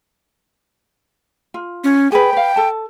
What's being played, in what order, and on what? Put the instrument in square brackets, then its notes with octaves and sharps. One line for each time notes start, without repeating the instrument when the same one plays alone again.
[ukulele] F4
[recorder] C#4
[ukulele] G#4 B4 [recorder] G5
[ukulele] B4 F5
A4 A5